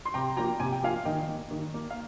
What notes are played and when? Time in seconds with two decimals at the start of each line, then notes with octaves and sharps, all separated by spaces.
0.05 C6
0.14 C3 G5 A#5
0.37 F3 A#3 G5 A#5
0.60 C3 G#5
0.72 G5
0.83 F3 A#3 F5 G#5
1.05 D#3 D#5 G5
1.28 A#3
1.51 D#3
1.74 A#3
1.90 F5